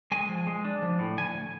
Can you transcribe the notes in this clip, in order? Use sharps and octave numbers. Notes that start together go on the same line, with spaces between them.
G#3 G#5
F3
G#3
D4
F3
A2
D2 G#5